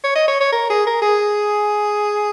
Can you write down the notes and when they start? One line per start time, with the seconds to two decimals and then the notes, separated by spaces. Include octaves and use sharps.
0.04 C#5
0.15 D#5
0.28 C#5
0.41 C#5
0.52 A#4
0.70 G#4
0.86 A#4
1.02 G#4